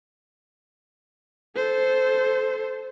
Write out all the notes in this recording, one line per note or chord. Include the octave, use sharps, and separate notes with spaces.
A4 C5